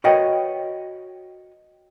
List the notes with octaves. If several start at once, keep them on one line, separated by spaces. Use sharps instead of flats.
F#4 A#4 B4 C#5 D#5 G5